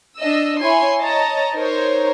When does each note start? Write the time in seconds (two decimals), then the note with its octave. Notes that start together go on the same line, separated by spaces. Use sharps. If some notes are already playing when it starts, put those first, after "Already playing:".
0.18 D4 D#5 E6
0.61 E4 C#5 G#5 C6
0.99 C#5 D#5 A5 A#5
1.55 D#4 A#4 C5 C#5